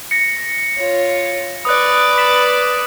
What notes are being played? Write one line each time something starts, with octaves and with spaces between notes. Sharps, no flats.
A#6 C#7
F4 C#5
B4 D5 D#6 F#6
B6 E7 F#7